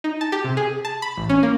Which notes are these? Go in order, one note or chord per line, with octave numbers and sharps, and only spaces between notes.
D#4
A5
G4
C3
G#4
A5
B5
A1
C#4
A#3